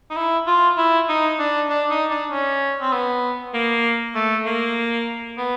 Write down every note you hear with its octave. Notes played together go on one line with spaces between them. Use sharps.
D#4
E4
F4
E4
D#4
D4
D4
D#4
D4
C#4
C4
B3
A#3
A3
A#3
B3